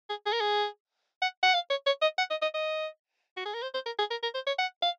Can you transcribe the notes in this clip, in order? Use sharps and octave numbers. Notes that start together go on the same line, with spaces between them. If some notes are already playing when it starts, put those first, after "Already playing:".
G#4
G#4
A#4
G#4
F#5
F#5
F5
C#5
C#5
D#5
F#5
D#5
D#5
D#5
F#4
G#4
A#4
C5
C5
A#4
G#4
A#4
A#4
C5
C#5
F#5
F5